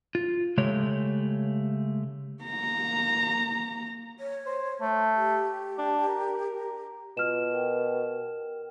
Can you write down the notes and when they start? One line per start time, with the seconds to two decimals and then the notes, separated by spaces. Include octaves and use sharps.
0.15 F4
0.58 C#3 G#3 A3 G4 C#5
2.44 A#3 A#5
4.18 C#5
4.47 C5
4.81 A3
5.15 G4
5.79 D4
6.08 A#4
7.17 B2 F4 F6 E7
7.51 A#4 G5